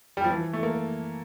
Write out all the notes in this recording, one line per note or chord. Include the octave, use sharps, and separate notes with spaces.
G3
F3
E3
A3
A#3